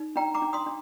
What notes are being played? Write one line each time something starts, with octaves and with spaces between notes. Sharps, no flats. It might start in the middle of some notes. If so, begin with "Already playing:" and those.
Already playing: D#4
D4 G5 A#5
A#5 D6
D4
C6 D#6
D4